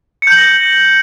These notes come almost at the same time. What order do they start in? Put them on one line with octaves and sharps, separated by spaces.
C#7 G6 F#7 A#6